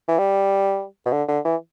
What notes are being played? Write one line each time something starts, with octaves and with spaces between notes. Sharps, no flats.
E3
G3
B2
D3
D3
E3